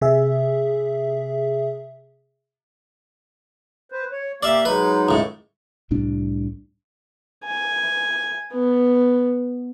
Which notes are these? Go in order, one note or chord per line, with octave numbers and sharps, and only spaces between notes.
C3 G#4 E5
B4 C5
C#5
A#3 G4 D5 E5 F5
F#3 G#3 D#4 B4
C#2 A2
C2 A2 G3 D4
G#5
B3